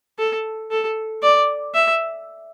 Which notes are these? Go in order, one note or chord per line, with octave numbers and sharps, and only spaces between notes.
A4
A4
D5
E5